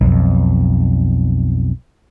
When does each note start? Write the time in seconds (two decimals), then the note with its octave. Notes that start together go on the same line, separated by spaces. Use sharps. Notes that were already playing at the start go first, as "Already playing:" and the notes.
0.01 B1 F2